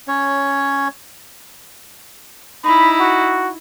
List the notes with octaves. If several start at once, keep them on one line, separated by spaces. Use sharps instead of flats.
C#4 C#5
D#4 E4 B5
F#4